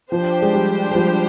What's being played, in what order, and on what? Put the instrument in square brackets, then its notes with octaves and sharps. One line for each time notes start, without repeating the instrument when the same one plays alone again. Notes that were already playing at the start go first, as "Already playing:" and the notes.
[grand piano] F3 [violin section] D4 G4 C5
[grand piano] G#3
F3 G3
G#3
F3 G3